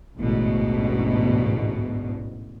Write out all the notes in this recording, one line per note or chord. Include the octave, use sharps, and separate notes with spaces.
A1 D2 G#2 B2